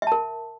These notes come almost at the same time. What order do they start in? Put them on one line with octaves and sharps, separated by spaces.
E5 A5 A#4